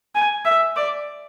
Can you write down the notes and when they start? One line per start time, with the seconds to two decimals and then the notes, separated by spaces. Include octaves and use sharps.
0.15 G#5
0.44 E5
0.76 D5